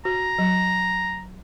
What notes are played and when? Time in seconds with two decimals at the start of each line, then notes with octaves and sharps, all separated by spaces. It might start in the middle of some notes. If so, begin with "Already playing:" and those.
0.05 F#4 A#5
0.38 F#3